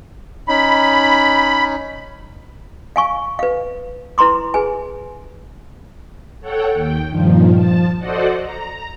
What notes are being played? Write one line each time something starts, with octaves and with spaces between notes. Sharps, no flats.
C#4 D#4 B5
F5 G#5 C#6
B4 F5
E4 B4 A#5 C6 D6
G#4 B4 G#5
A4 C#5 F#5 G5
D#2 G5
G2 A#2 D#3 F3
F3 A5
F#4 A4 C5 D5 D#5 F#5
A#5